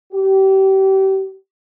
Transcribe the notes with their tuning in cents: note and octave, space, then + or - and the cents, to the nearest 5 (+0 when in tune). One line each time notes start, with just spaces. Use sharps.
G4 -30